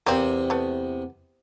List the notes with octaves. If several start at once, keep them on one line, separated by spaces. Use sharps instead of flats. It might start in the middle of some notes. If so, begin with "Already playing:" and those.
E2 C3 A#3 C4
A3 B3